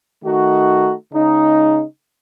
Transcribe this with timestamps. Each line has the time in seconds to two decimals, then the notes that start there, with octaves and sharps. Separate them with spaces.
0.23 D#3 A3 D#4 F#4
1.12 C#3 G#3 D#4